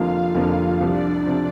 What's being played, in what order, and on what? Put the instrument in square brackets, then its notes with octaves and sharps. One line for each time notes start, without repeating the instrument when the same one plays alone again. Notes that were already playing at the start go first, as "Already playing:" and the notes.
Already playing: [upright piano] F1 F2 D3 F3 A#3 [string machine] F4 F5
[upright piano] F1 F2 D3 F3 A#3 [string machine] F4 F5
[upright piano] C2 C3 F3 [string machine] D4 D5
[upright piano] C3 F3